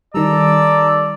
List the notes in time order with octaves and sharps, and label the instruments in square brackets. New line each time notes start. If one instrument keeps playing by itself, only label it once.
[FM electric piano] D#3 G3 [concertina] A4 A#5 E6 [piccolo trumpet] D5